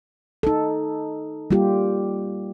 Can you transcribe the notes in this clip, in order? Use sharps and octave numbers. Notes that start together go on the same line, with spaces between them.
D#4 A4
G3 A#3 F4 G4